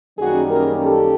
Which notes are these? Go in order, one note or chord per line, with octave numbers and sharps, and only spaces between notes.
F#2 D#3 G3 A#3 C#4 F#4 G#4
G#4 A#4
G4 A4